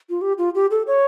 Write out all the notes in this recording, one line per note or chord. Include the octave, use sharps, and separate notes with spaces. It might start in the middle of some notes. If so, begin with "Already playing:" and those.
F4
G4
F4
G4
A4
C#5